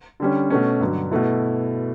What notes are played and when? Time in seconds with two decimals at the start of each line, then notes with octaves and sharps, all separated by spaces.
0.20 D3 G3 C#4
0.50 B2 A3 C#4
0.80 G2 D3 F#3
1.11 B2 A3 E4